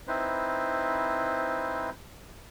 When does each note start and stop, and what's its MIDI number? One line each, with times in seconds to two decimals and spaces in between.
0.08 1.90 60
0.08 1.90 63
0.08 1.90 64
0.08 1.90 71
0.08 1.90 72